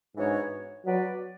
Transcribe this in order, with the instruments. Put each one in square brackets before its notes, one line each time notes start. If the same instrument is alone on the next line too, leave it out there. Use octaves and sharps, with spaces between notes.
[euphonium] G#2 [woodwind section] E3 B3 D4 F#4 C#5
[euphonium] F#3 [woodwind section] B3 F#4 B4 D5